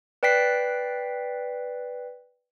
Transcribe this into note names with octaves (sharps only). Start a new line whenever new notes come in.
B4 D5 G5 F#6 B6 C7